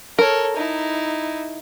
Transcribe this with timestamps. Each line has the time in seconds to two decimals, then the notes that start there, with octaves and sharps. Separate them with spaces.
0.19 A4 A#4 C#5
0.56 D#4 E4